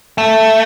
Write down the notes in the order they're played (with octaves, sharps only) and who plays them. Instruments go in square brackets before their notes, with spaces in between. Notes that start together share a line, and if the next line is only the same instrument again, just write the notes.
[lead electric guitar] A3